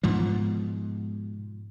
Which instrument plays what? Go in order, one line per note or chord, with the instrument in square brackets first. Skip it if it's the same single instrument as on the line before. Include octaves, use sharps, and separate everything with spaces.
[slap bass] G#2 B2 F3